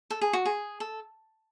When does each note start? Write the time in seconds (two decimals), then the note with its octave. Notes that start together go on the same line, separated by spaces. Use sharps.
0.11 A4
0.22 G#4
0.33 F#4
0.45 G#4
0.80 A4